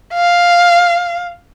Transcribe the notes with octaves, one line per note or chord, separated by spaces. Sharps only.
F5